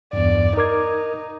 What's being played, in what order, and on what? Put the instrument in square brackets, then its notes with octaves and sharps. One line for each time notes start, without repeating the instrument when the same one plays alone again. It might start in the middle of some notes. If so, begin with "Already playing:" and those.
[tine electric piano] E2 G2 [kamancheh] D5
[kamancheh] D#4 [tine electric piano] A#4 D6 G#6